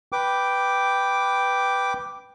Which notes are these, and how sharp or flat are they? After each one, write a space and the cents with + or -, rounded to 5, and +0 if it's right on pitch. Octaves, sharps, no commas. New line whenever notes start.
B4 +0 G5 +0 D6 +0